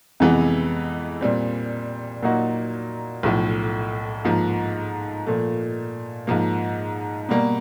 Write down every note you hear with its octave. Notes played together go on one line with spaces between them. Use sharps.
F2 C3 E3 G#3 B3
A#2 G3 C4
A#2 F#3 A#3 D#4 F#4
B1 A2 F3
G#2 F3 A#3
A#2 F3 A3
G#2 F3 A#3
B2 G3 A#3